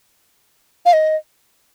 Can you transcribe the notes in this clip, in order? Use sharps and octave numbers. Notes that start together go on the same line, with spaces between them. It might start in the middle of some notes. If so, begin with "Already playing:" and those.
F5
D#5